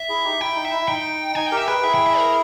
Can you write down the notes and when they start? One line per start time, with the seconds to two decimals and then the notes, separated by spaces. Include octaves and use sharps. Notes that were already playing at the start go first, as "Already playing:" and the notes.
Already playing: E5
0.09 E4 G#4
0.25 D#4 G4
0.40 E4 G5
0.56 D#4
0.65 E5
0.72 E4
0.82 E4
0.88 D#4 G5
1.35 D#4 G#5
1.46 G5
1.52 G4 A#4
1.57 E5
1.67 G#4 B4 G5
1.82 E4 G#4 E5
1.94 G5
2.07 E5
2.19 A#4